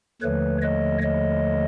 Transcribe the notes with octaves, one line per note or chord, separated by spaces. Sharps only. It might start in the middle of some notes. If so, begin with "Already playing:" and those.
D#2 D3 F3 A3 B4 C#5
C#5 D#5
C#5 D#5